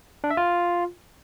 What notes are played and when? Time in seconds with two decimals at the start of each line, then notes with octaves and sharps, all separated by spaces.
0.24 D4
0.30 E5
0.37 F4